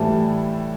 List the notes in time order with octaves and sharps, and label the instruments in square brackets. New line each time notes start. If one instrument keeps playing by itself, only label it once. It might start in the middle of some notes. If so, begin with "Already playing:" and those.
Already playing: [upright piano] A2 E3 G3 A5